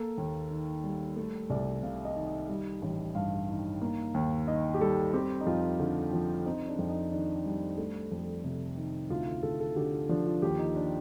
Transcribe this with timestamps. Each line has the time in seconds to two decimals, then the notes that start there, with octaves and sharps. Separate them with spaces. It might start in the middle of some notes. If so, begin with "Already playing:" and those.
Already playing: A#3 A4
0.18 D#2
0.51 D#3
0.84 G3
1.16 A3 A4
1.50 C2 D5
1.83 C3 F5
2.05 D#5
2.16 D#3
2.27 D#5
2.49 G3
2.82 A1
3.15 G2 F5
3.49 D#3
3.81 A#3
4.14 D#2
4.48 D#3 D#5
4.74 G4
4.80 G3 A4
5.13 C4 G4
5.41 D#4
5.46 F2 F4
5.80 D3
6.13 F3
6.46 C4 D#4
6.68 D4
6.79 F2
6.89 D#4
7.12 D#3 D4
7.45 G3
7.78 A3
8.12 F2
8.44 C3
8.77 D#3
9.10 D2 F4
9.43 D2 A4
9.60 A4
9.76 D3 G4
9.93 F4
10.09 F3 D4
10.26 F4
10.42 D#2 G4
10.59 D#4
10.76 D4